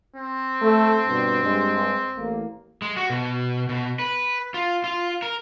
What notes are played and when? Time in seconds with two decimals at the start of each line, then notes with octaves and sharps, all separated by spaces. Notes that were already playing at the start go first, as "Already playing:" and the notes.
0.16 C4
0.62 A3 A4
1.08 G2 B2 G3
1.43 G2 G#3
2.17 A1 A#3
2.82 G#3
2.97 F#4
3.10 B2
3.69 B2
3.99 B4
4.54 F4
4.84 F4
5.22 A#4